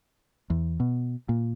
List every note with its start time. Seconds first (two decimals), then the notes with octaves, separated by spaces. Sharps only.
0.50 E2
0.80 B2
1.29 A#2